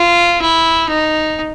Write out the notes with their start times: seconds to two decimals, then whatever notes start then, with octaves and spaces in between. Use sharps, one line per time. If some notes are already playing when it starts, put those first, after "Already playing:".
Already playing: F4
0.42 E4
0.89 D#4